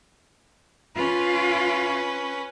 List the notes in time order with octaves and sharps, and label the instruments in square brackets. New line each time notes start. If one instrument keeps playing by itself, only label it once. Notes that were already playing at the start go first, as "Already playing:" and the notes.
[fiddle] C#4 B4 [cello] F4